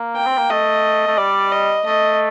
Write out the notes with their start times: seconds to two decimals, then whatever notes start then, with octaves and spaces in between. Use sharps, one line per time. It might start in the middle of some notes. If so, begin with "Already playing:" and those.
Already playing: A#3
0.16 G5
0.26 C4
0.38 A#3
0.50 A3 D#5
1.08 A3
1.18 G3 D5
1.52 D#5
1.85 A3 D#5